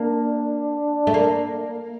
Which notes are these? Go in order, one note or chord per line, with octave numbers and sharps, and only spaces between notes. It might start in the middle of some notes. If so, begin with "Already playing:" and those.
Already playing: A#3 D4
A3
A#3